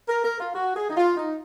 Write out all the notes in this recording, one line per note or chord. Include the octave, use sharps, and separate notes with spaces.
A#4
A#4
F4
F#4
G#4
D#4
F4
D#4